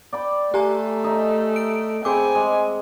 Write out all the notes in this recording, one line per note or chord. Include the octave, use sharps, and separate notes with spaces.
D5 G5 B5
A3 G4 G#5 A#5
D#4 E5
D7
C4 G#4 G#5 B5 D6
G#3